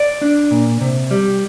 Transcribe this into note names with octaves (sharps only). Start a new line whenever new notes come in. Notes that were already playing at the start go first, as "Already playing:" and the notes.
Already playing: D5
D4
A#2
C3
G3